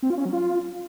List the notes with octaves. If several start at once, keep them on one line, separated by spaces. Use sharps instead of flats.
C4
F4
C#4
F#3
F4